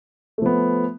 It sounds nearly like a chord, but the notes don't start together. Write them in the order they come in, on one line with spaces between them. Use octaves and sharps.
A3 F3 B3